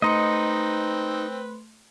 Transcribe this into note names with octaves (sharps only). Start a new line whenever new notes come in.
A3 C4 D#4 B4 D#5 C6 C#7